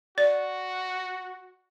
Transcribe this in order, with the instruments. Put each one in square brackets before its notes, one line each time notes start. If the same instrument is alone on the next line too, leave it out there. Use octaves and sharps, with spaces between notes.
[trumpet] F#4 [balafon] D5